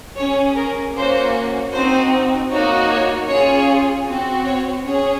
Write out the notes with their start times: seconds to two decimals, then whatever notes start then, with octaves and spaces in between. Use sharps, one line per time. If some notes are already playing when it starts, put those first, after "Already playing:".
0.16 C#4 G#4 C#5
0.55 A#4
0.94 A#3 C#4 F#4 C5
1.72 C4 D#4 F#4 C5
2.50 A#3 D#4 F#4 C#5
2.90 C#5
3.28 C#4 F4 G#4 C#5
4.07 C4 F#4
4.46 C#5
4.85 C#4 G#4 C#5